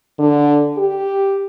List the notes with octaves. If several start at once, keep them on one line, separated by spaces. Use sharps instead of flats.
D3
G4